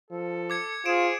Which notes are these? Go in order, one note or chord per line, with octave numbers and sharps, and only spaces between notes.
F3 A4
D6 G#6 C#7
F4 G#4 C5 D7 E7